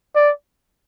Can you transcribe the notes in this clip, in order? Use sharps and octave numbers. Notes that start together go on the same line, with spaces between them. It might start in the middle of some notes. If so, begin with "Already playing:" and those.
D5